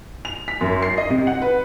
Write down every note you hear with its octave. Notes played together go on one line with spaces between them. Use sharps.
F7
B6
F#2
C7
D#5
C3
F#5
B4